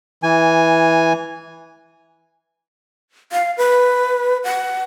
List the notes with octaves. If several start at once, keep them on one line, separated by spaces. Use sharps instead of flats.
E3 G#5
F5
B4
F#5